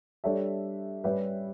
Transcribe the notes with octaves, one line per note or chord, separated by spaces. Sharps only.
G3 D4 A4 C#5 E5
G3 C#4 G4 B4 E5